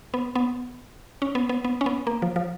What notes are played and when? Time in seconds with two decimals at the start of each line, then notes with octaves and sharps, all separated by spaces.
0.14 B3
0.35 B3
1.22 C#4
1.35 B3
1.49 B3
1.64 B3
1.81 C#4
1.86 B3
2.07 A#3
2.22 F3
2.36 F3